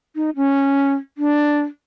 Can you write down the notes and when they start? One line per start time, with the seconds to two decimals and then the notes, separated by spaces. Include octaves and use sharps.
0.16 D#4
0.36 C#4
1.18 D4